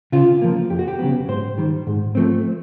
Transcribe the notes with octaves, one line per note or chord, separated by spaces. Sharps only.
C#3 F4
F3 A#3
F2 G4
F#4
G4
C#3 F#3 B3
G#2 C5
D#3 G3
G#2
F3 A3 C4